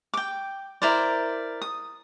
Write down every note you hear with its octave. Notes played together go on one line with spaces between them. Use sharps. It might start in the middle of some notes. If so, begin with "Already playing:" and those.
G5 D6
E4 A#4 C5 D5
D#6